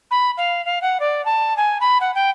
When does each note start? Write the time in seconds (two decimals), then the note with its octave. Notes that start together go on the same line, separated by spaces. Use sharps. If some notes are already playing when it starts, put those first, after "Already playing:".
0.11 B5
0.37 F5
0.65 F5
0.82 F#5
1.00 D5
1.25 A5
1.57 G#5
1.81 B5
2.01 F#5
2.15 G5